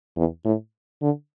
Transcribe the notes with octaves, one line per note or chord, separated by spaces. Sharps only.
E2
A2
D3